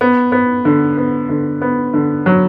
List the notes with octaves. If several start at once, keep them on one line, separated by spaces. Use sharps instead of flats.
B3
B3
D3
B3
D3
B3
D3
F#3